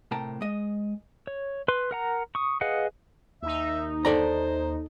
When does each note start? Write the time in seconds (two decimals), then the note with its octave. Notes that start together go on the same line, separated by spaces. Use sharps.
0.11 A2 C3 A#4 G5 A5 A#5
0.41 G#3 D#5
1.27 C#5
1.68 B4 C6
1.91 A#4 F#5 A#5
2.35 C#6 D#6
2.61 G#4 B4 D#5 F5 F#5
3.43 D#2 D#4 E5
4.05 A4 C5 D5 A#5